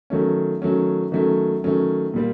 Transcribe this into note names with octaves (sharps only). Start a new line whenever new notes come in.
D#3 F#3 A3 C#4
D#3 F#3 A3 C#4
D#3 F#3 A3 C#4
D#3 F#3 A3 C#4
A#2 G3 A#3